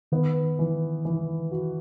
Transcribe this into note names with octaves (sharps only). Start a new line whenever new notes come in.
D#3 B3
E3
E3
F#4